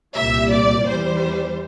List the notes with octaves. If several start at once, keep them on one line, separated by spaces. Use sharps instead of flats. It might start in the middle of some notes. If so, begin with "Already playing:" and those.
C2 A#2 G3 E5
D5
E2 E3 G3 C5